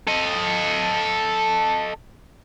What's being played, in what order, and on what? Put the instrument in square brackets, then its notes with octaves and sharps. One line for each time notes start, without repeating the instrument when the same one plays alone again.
[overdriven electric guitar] A4 D#5